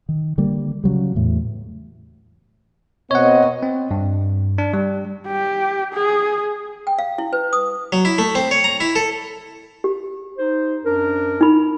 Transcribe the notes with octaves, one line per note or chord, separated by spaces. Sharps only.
D#3
D3 G3 A#3
C#3 F#3 G3
E2 A2
B2 C4 C#5 D#5 F#5
C4
G2
D4
G3
G4
G#4
G5
F5
E4
B4
D#6
F#3
E4
A3
C4
C#5
A#5
E4
A4
G4
D#4 C5
F#2 D4 A#4
D#4 B5